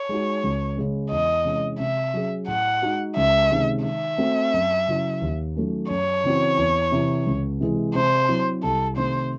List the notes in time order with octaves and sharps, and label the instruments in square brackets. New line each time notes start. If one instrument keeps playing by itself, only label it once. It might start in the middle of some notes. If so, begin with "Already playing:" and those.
Already playing: [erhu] C#5
[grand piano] G#3 D#4 F#4
C#2
C#3 G#3 C#4
[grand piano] E2 [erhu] D#5
[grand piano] C3 E3 G#3 C#4
[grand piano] C3 [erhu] E5
[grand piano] F#3 C#4 G#4
[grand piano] A2 [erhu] F#5
[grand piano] G#3 D#4 F#4
[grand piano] C#2 [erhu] E5
[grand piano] C3 D#3 G#3 C#4
[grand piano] D#3 [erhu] E5
[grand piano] A3 C4 F#4
F#2
C#3 F#3 C#4 E4
D#2
D#3 F#3 A3 C#4
[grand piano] F#2 [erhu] C#5
[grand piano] C#3 E3 C4 F#4
E2
C3 E3
C#2
C3 E3 G#3
[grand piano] C3 [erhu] C5
[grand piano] F#3 C4 E4
[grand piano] C2 [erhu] A4
[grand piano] C3 D#3 A3 [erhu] C5